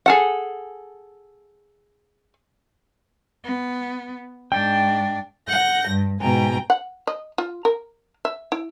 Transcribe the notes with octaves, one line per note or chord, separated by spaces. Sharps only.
G#4 A4 F#5
B3
G#2 D4 G5
F#5 G6 A#6
G2
G#2 B2 G5 G#5 A#5
F#5
D#5
F4
A#4
E5
E4